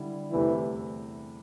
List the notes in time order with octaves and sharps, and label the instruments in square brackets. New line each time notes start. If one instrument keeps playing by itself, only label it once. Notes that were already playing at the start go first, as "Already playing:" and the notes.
Already playing: [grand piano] D3 G3 E4
[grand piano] E2 C3 A3 E4 [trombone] E3